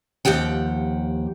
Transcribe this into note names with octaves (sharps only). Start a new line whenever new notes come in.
D#2 F3 G4 F#5 G5